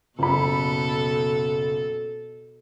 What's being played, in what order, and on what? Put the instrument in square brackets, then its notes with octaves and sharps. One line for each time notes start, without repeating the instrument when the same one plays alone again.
[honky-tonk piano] F#1 B5 [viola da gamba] B2 A4